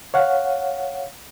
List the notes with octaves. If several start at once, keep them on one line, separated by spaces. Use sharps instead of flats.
C#5 F5 F#5